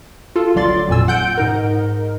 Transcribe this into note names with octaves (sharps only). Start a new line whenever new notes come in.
F4 A4
G1 D2 F#3 D5 C6 A6
G#1 F2 A#2 G#5 E6
F#5 G6 D7
G#2 D#4 A#4